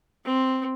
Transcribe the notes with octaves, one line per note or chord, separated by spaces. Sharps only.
C4